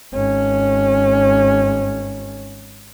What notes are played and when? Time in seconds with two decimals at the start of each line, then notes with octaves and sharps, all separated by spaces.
0.14 G#1 C#4